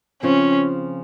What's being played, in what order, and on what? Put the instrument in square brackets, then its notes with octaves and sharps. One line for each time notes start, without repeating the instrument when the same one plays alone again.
[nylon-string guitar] C#3 F3 C4 F4 [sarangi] C#4